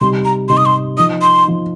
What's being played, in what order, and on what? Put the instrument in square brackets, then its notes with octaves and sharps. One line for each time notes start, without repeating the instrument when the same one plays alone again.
[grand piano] C3 G3 D#4 [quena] C6
[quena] A#5
[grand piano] C3 G3 D#4 [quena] C6
[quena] D#6
C6
[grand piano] F3 D#4 [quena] D#6
[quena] C6
[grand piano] F3 D#4